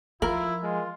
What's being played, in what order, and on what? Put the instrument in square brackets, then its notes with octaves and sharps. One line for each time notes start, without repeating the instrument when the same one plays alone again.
[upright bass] F3 [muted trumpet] E4 [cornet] F4 [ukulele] A#4
[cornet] G#3 [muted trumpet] F4